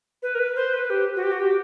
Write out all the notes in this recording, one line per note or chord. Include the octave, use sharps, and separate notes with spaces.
B4
A#4
B4
C5
B4
G4
F#4
G4
F#4
G4